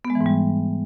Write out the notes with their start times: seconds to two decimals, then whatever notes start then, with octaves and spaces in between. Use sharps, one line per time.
0.05 B3
0.10 G#3
0.15 E3
0.21 G#2
0.26 G3